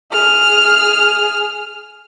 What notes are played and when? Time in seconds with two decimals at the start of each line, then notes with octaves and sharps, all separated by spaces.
0.12 G#4 F6